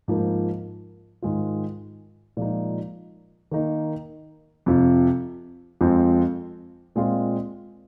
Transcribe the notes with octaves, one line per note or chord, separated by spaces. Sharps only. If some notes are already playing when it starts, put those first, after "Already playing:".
G#2 F3 A#3
G#2 D#3 G#3 F4
A#2 F3 G#3 D#4
D#3 A#3 D#4
F2 C3 F3
F2 F3 G#3 C4
A#2 G#3 C4 F4